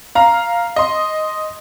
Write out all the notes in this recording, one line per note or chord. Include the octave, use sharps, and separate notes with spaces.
F5 A#5
D#5 C6